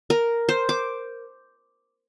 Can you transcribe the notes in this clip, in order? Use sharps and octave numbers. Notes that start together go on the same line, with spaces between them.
A#4
C5
D6